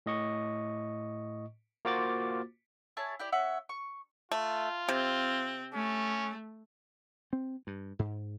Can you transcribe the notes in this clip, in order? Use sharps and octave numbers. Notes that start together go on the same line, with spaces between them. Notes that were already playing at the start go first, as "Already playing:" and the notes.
A2 D#5 C#6
A#3 F4 F#4 C5 D6 A6
E4 G#4 C#5 A5
E4 G4 D5
C#4 E5 F#5
C#6
A3 F4
C3 C4
A3 C#4
C4
G2
G#2